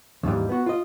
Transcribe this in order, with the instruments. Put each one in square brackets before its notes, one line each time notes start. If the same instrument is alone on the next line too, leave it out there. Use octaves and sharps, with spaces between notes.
[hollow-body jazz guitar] D#2 G#2 E3 G3
B3 F#4
F4 D#5